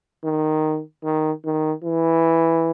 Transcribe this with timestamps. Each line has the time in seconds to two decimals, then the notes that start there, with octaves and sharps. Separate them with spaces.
0.24 D#3
1.03 D#3
1.44 D#3
1.84 E3